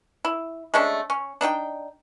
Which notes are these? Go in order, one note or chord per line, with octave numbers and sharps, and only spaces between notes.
E4
G#3 A3 C#4 D4
C#4
D4 D#4 G4 G5